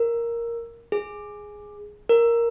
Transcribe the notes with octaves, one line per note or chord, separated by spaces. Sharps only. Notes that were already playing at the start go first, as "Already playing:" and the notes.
Already playing: A#4
G#4
A#4